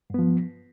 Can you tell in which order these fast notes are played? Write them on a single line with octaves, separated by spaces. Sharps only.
G2 B3 F3